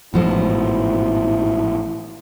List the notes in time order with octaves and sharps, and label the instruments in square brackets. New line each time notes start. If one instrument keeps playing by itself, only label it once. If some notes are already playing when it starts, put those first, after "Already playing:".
[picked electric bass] A1 G#2 [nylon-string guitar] B2 F3 A4 [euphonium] E4